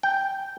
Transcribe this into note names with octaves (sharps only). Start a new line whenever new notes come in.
G5